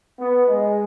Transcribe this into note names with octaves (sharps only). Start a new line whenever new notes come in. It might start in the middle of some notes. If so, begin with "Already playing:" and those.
B3
G#3